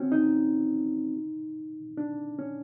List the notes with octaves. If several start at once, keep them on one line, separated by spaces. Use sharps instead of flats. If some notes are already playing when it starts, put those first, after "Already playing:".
Already playing: C4 C#4 F#4
D#4
D4
C#4